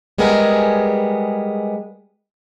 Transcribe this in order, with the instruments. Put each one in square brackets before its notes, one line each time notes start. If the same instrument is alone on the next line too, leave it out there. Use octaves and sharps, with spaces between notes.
[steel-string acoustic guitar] G3 G#3 B3 G#4 A#4